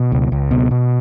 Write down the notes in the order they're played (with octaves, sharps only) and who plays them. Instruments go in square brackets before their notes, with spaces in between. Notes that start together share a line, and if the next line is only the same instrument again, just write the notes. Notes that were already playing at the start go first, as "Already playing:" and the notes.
Already playing: [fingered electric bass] B2
C#2
C#2
B2
B2